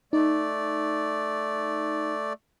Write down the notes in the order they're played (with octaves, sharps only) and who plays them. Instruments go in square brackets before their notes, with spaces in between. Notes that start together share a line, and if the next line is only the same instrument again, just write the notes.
[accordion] A3 D5 [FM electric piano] D#4